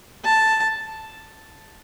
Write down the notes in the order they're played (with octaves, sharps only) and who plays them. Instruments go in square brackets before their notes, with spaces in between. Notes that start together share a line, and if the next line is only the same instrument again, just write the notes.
[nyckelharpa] A5